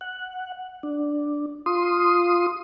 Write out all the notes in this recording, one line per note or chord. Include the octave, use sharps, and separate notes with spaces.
F#5
D4
F4 C6 D#6